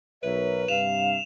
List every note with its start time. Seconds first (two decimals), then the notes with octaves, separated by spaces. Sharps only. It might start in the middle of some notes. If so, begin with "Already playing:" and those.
0.23 B1 A#4 B4 C#5 E5
0.68 G2 C3 F5 E7 F7